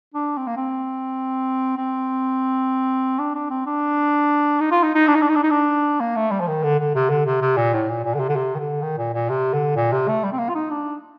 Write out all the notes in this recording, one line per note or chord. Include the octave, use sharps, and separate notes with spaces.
D4
C4
A#3
C4
C4
D4
D4
C4
D4
D#4
F4
D#4
D#4
D4
D#4
D4
D#4
D4
D#4
D4
A#3
A3
G3
F3
D#3
D3
D3
C3
D3
C3
C3
A#2
A2
A#2
A#2
D3
C3
D3
C3
D#3
D3
D#3
A#2
A#2
C3
D3
A#2
C3
A3
G3
C4
A#3
F4
D#4
D4